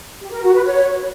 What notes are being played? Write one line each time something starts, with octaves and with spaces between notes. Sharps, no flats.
G4
A#4
F#4
B4
C#5